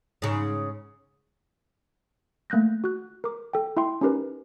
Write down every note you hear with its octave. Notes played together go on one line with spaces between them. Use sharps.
G#2 C#3
A3 A#3 F#6 G6 A#6
F#4 F#6
A#4 D6
A4 G5
E4 E5 G5 C6
C#4 D#4 G4 A#4 B4